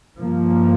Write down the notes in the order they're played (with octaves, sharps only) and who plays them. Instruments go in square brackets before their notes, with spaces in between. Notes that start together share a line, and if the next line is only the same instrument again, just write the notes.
[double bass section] G2 F3 A#3